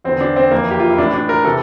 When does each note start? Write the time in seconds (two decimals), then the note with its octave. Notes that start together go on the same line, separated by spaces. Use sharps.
0.04 E2 D3 C4
0.21 D4
0.36 C4
0.51 F2 E3 A#3
0.71 G4
0.80 F4
0.90 E4
0.98 A2 E3 D4
1.13 D4
1.29 A#4
1.45 C3 E3 A4